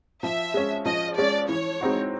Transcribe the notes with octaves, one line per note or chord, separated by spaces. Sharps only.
F3 E5
G#3 C#4
F3 D#5
G#3 C#4 D5
E3 C#5
G#3 C4 D#4 F#4